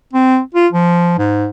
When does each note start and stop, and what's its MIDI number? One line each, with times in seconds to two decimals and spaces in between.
0.13 0.40 60
0.55 0.68 65
0.73 1.18 53
1.19 1.47 44